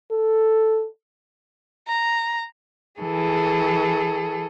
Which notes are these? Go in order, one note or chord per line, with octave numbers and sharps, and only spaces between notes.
A4
A#5
E3 G#4 A4